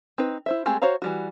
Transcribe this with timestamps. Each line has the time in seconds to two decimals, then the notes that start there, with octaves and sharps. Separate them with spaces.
0.18 C4 D#4 B4
0.46 E4 C5 E5
0.66 G#3 A3 C4 G4 G#4
0.82 F#4 C5 C#5 F5 A#5
1.02 E3 G3 F#4